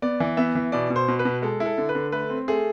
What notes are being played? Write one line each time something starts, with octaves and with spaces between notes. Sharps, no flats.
B3 D5
E3
B3 E5
E3
B2 D5
B2
C5
B2
B4
B2
G#3 A4
E4
A4
D3
B4
D3
A3 B4
C4
A3 G#4